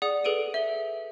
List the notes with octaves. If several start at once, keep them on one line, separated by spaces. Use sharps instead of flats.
G#4 D5 F#5 D#6
G#4 A4 B4 D7 D#7
E5 G7